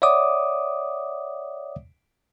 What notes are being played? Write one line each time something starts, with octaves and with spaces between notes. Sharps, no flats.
C#5 D5 E5 F#5 D6 D#6